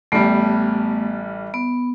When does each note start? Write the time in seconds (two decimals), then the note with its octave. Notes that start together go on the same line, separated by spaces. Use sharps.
0.12 A1 G3 A3 B3
1.54 B3